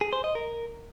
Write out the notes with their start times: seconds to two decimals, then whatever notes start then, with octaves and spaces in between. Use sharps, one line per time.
0.01 G#4
0.13 C5
0.24 D#5
0.35 A#4